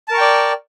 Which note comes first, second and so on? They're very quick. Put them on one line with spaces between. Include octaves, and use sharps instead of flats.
A5 A#4 C#6 G5 D5